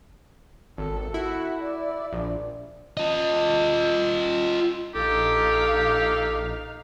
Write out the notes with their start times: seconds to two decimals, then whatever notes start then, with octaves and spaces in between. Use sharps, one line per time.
0.78 G#1 A4
1.14 E4 F#4
1.62 D5
2.13 A#1
2.97 F4 D#5
4.95 A#1 D#4 G4 A4 F5